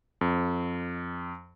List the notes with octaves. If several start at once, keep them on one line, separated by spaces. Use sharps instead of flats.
F2